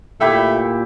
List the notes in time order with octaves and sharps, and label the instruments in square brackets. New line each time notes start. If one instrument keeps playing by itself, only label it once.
[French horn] A#2 [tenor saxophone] A3 [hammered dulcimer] E4 G4 E5